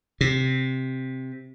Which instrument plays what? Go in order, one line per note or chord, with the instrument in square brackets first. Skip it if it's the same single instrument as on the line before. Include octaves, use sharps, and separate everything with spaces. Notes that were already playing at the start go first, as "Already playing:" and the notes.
[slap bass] C3